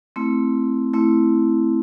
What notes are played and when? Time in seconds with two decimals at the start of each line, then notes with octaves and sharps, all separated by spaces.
0.16 A3 C4 E4
0.94 A3 C4 E4